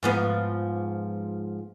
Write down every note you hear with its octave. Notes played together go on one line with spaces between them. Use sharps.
G#2 F3 B3